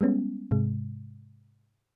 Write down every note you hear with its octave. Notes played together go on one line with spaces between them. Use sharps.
G3 G#3 B3 C#4
G#2 C3 G#3